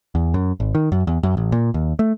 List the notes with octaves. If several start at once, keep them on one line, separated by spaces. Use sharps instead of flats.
E2
F#2
G#1
D#3
F#2
E2
F#2
A1
A#2
D#2
A3